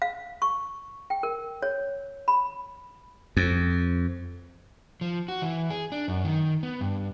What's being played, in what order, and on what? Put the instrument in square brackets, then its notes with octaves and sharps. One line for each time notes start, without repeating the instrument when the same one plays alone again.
[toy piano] F5
C#6
G5
A#4
C#5
B5
[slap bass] F2
[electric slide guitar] F3
F#4
E3
G#4
D4
F#2
D#3
B3
G2